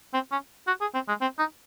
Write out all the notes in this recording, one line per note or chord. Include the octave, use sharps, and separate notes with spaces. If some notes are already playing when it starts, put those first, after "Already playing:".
C4
C#4
F#4
G#4
C4
G#3
C4
D#4